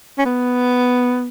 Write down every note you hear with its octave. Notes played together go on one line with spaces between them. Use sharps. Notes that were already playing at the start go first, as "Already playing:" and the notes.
C#4
B3